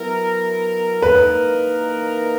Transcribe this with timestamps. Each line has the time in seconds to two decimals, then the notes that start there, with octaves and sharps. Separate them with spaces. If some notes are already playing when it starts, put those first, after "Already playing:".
Already playing: F#3 B3 E4 A#4
1.02 E3 A#3 D#4 A#4 B4